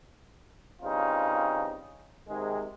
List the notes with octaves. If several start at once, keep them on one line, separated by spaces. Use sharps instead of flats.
G2 C#3 C4 D#4 F4
G#2 C3 D#3 G#3